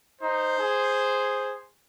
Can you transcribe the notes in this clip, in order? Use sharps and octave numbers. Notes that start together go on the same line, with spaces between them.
D#4 C5
G#4